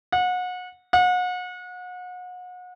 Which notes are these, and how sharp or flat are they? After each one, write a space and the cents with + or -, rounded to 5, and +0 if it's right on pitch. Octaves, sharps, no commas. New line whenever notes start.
F#5 -30
F#5 -35